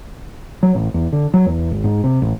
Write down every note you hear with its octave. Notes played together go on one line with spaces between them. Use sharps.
F#3
A1
E2
D3
F#3
E2
G#1
G#2
C3
A1